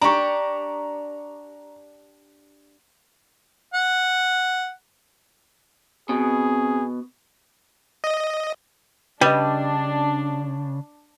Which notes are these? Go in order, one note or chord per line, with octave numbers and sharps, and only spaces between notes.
D4 G4 A#5 C#6
F#5
B2 C4 G#4
D#5
C#3 G3 D4 B4 D#5